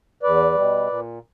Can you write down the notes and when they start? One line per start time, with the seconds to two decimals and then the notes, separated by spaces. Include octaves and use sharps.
0.23 E2 B4 D5
0.55 B2 G3
0.87 A#2